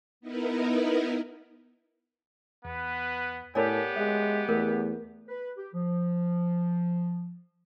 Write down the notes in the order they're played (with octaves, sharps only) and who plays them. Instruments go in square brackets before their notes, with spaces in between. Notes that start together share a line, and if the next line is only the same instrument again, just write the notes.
[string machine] B3 D#4 E4 A#4 B4
[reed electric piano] E2 [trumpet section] B3 B4
[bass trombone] A2 [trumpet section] B3 G4 [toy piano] A#4 C#5 D5 [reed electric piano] G#5 A5
[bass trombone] G#3 [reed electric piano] E5 F#6
[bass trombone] E2 [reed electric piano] A3 [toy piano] A#4
[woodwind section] B4
G4
F3